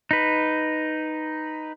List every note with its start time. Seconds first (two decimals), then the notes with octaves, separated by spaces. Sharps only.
0.11 D#4 B4